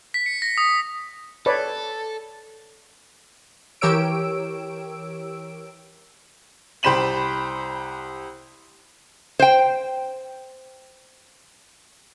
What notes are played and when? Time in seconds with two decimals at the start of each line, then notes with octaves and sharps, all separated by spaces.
0.14 B6
0.26 C#7
0.42 A#6
0.58 D#6
1.46 A4 B4 C#5 D5
3.81 E3 G4 A#4 C#5 E6 D7
6.83 C2 G4 C5 B5 E7 F#7
9.39 C5 G5